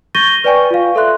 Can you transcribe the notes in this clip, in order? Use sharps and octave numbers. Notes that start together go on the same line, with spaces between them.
C#6 G6 A6 A#6 D#7 G7
B4 D5 G5 G#5 C#6
F4 F5
A4 E5 C6 F#6